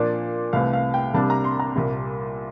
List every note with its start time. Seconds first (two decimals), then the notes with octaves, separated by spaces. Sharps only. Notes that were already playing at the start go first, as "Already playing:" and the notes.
Already playing: A#2 F3 A#3 D4 D5
0.53 C2 C3 E3 A3 F5
0.73 F5
0.94 G5
1.14 C2 C3 G3 A#3 D4 A5
1.30 A#5
1.44 C6
1.60 A#5
1.76 C2 A#2 G3